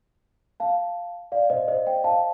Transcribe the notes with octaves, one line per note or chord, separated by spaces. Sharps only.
F5 A5
D5 F5
C5 D#5
C5 D#5
D#5 G5
F5 A5